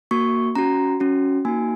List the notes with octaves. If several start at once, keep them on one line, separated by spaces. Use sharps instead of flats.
A#3 F#4 C#6
C#4 F#4 A#5
C#4 F#4
A#3 D#4 F#4 G#5